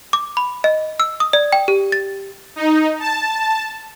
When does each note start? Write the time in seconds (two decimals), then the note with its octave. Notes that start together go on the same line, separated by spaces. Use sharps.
0.13 D6
0.37 B5
0.64 D#5
1.00 E6
1.20 D#6
1.33 D5
1.52 G5
1.68 G4
1.92 A6
2.56 D#4
3.00 A5